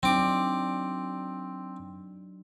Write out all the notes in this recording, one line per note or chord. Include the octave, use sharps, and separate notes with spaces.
F#3 C4 D4 D#4 D6